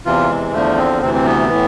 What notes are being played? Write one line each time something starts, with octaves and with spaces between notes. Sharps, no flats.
E2 C3 E3 F4
G#3
E2 D3 F3 A3
C4
D2 C3 E3 C4
C4
B3
A2 E3